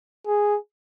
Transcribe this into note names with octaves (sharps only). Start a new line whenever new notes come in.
G#4